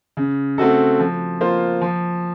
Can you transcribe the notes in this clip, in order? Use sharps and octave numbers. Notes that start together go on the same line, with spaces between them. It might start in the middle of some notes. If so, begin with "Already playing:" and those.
C#3
A3 C4 F#4 A4
F3
A#3 F4 C5
F3